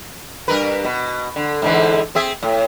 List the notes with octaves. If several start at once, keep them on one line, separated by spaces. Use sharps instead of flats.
G2 A#4 B4
B2
D3
G#2 D3 E3
C4 G#4 E5
A2